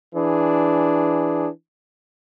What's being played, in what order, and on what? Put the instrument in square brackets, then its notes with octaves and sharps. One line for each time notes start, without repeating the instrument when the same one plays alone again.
[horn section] E3 D4 G#4